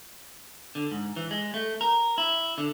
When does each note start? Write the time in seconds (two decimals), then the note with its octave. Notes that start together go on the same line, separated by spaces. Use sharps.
0.75 D3
0.91 G#2
1.16 E3
1.31 G#3
1.54 A3
1.81 A#4
2.18 E4
2.58 D3